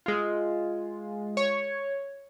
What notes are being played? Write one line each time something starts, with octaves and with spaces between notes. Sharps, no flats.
G#3 F4
C#5